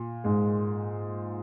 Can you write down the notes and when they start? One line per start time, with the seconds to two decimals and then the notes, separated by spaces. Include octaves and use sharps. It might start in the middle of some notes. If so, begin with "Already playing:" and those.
Already playing: A#2
0.24 G#2 G#3